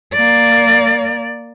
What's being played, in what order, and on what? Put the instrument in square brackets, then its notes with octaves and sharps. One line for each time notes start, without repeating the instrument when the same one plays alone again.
[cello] A#3 D5